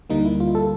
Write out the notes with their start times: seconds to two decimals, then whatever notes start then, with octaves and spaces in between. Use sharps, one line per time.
0.10 D2 D3 G3 A#3 D#4
0.25 E4
0.40 F4
0.55 A4